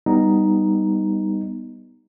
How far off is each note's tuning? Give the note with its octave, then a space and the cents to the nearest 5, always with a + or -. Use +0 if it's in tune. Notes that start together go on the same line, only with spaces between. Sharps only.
G3 +0 B3 +0 D#4 +0